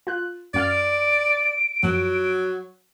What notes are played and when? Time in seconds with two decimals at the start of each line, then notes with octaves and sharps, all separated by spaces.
0.07 F4 F#6
0.54 F#2 D5 F5 F6 D7
1.83 F#2 F3 F#3